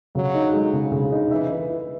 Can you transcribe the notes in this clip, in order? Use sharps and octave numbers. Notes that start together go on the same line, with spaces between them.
C#3 F#3
D#4
G#3
C#3
C#3
D#4
E3 E5
B4
E4